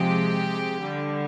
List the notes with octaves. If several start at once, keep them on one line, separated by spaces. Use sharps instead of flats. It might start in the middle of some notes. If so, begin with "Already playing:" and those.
Already playing: C3 F3 G#3 G4
D3 G3